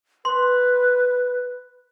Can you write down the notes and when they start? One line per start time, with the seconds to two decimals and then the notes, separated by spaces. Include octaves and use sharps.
0.25 B4 C6